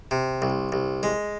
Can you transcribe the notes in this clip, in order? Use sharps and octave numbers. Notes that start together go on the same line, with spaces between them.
C3
C2
C2
G#3